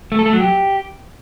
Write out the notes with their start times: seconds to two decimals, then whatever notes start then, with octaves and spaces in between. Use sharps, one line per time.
0.12 A3
0.19 A4
0.26 A3
0.33 F#3
0.40 G4